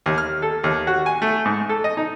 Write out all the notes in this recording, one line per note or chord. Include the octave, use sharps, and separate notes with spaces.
D#2
F6
A4
D#2
F#4
G#5
A3
G#2
A4
D#5
D#4